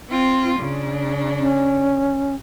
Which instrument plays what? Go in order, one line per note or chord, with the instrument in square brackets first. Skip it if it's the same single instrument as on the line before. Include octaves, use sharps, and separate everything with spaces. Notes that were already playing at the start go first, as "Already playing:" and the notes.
[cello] C4 F4
C#3 D4
[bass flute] C#4